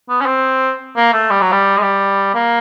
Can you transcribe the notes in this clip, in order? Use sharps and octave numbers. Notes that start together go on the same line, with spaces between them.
B3
C#4
C4
A#3
A3
G3
F#3
G3
G#3
G3
A#3